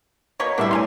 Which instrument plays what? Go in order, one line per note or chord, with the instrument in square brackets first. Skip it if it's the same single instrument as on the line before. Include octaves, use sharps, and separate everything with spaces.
[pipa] B2 A#3 C#5
[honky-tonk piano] A2 G3 B3 [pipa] D4 E4 E5
[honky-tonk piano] E4 C#5 [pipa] G#5 A#5 C6